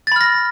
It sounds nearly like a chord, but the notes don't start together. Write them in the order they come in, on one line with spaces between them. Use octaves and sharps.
A6 B5 F6 A#6